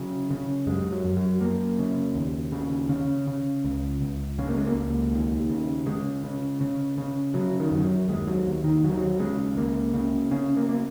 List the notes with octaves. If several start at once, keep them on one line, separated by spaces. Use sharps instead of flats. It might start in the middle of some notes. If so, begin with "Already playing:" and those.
Already playing: C#3 F#3
C#3
F#2 G#3
F#3
F#2
F#3
F#2 A#3
C#3
D#2
C#3
C#3 C#4
C#3
C#2
C#2
C#3 C#4
A#3
G#3
A#3
C#2
D#2
C#3
C#3 G#3
C#3
C#3
C#3
C#3 F#3
D#3
F#2 D#3
F#3
D#2 G#3
F#3
D#2
D#3
D#2 F#3
D#3
F#3
C#3 G#3
C#2 A#3
C#3
C#3 C#4
A#3
A#3